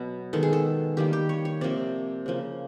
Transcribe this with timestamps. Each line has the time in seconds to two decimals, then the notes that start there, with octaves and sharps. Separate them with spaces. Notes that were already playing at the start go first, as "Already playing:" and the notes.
Already playing: B2 F#3 B3 B4
0.33 D#3 G#3 B3 A4
0.43 G#4
0.53 A4
0.97 D#3 G3 A#3 G4
1.13 G4
1.29 C#5
1.45 C#5
1.61 C3 F3 A#3 D5
2.26 C#3 F3 A#3